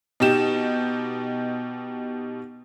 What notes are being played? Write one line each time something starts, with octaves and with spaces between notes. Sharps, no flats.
B2 D#4 G4 E7